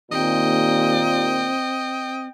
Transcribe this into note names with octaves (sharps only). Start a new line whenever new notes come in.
D#2 A#2 C4 D#5 G5